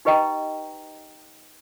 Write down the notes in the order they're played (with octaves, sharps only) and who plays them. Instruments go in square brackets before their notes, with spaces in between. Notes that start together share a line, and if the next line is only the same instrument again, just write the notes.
[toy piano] D#4 G4 B4 D#5 G5 A#5